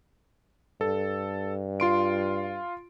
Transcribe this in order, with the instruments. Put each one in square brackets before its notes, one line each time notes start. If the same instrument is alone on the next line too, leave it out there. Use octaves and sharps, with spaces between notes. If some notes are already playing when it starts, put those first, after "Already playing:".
[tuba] G2 [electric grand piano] A4
[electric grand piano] F4 C6 D7